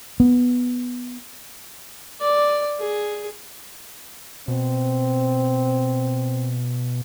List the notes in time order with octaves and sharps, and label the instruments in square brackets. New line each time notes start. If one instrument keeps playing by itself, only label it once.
[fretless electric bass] B3
[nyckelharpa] D5
G#4
[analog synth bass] B2 [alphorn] C4